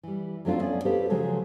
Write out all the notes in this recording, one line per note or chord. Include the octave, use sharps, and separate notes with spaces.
E3 G3
F2 F#3 A3 C4 D4 F4
B3 C#4 D5 F5
G4 A4 B4 C5 F5
C#3 F3 F#3 G#3 A4